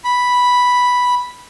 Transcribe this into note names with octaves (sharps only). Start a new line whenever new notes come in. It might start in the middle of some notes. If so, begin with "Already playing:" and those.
B5